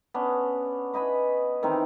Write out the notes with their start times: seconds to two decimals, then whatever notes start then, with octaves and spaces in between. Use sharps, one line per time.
0.14 B3 C#4 D4
0.93 B4 D#5 G#5 B5
1.63 D#3 E3 C4 D#4